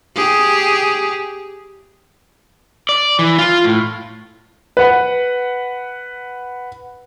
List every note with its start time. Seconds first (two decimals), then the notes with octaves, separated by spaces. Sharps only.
0.15 G4 G#4
2.89 D5
3.19 E3
3.38 F4
3.64 A2
4.77 B4 F#5